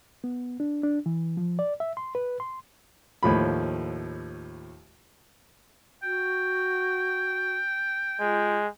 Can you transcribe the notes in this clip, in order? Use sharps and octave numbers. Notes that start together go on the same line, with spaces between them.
B3
D4
D4
E3
F3
D5
E5
C6
B4
C6
D#2 A2 F3 B5
F#4 G5
G#3 F4